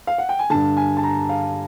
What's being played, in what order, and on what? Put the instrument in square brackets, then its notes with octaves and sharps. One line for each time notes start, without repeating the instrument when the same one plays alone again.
[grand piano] F5
F#5
G5
G#5
G2 D3 A5
G#5
A5
A#5
F5